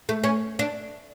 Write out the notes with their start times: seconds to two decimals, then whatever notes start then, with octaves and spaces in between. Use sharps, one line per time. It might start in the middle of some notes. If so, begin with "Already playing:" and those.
0.09 A3
0.24 C#4
0.59 D4